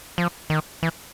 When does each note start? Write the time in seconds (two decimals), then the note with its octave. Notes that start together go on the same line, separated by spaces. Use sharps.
0.18 F3
0.50 D#3
0.83 E3